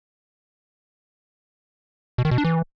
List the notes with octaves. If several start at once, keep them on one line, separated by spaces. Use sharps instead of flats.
B2
D#3
B2
D4
E3